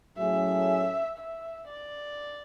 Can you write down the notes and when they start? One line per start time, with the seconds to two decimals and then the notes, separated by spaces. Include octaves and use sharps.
0.17 A2 F#3 A3 C#4 G#4 E5
1.18 E5
1.68 D5